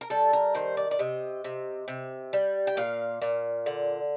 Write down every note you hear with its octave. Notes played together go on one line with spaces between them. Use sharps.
A#4
G3 A4
A#4
D#3 C5
D5
D5
C3 D#5
C3
C3
G3
G5
A#2 F5
A#2
D3